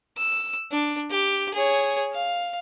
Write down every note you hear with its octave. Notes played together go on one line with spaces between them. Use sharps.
E6
D4
G4
G#4 C#5
F5